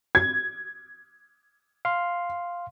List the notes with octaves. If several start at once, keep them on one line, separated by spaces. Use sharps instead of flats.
G#6
F5 C6